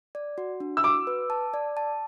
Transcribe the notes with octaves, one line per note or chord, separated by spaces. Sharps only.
D5
F#4
D4
E6
F#4 D6
B4
A5
D5
A5